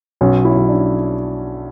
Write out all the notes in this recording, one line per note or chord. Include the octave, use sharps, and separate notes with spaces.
B1 C#4
E4
B1
D4